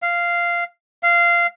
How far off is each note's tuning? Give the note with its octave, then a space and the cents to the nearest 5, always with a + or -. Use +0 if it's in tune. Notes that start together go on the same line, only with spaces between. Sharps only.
F5 -10
F5 -15